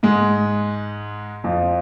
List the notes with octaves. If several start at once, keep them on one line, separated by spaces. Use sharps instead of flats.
G#2 G#3
F2 F3